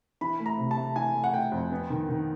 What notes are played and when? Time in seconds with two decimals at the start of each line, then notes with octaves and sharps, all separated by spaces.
0.21 E3 B5
0.40 A3
0.46 A#5
0.58 C3
0.71 A5
0.77 A3
0.96 E3 G#5
1.14 A3
1.24 F#5
1.34 A3 G5
1.52 F2
1.72 B3
1.90 D#3
2.09 D#3